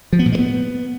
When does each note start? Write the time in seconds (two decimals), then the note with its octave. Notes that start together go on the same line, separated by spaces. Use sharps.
0.13 F3
0.19 B3
0.26 A#2
0.32 G#3
0.39 B3